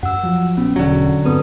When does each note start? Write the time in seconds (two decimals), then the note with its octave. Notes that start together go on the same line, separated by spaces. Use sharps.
0.03 F#2 F#5 E6
0.23 F3 F#3
0.57 A#1 B3 C#4
0.76 E1 D3 F#3
1.25 G2 B3 C4 A4 B4 D#6